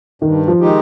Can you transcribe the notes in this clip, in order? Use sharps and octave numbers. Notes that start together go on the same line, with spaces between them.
G2 D#3
F3
D#3 G#3 D#4 G4